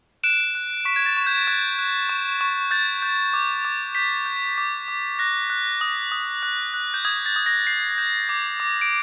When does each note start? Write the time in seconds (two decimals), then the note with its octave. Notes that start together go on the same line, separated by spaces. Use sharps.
0.24 F#6 D7 E7
0.55 F#6
0.85 C#6 B6
0.96 G#6
1.06 A6
1.17 C#6
1.27 G6
1.47 F#6 G#6
1.79 F#6
2.09 C#6
2.41 C#6
2.71 G6 A6
3.02 G6
3.34 D6
3.65 D6
3.95 G6 B6
4.26 G6
4.58 D6
4.88 D6
5.19 F#6 A#6
5.50 F#6
5.81 D#6
6.12 D#6
6.43 F#6
6.74 F#6
6.94 G6
7.05 D#6 G#6
7.26 A6
7.36 D#6
7.46 A#6
7.67 G6 C7
7.98 G6
8.29 D6
8.60 D6
8.81 D7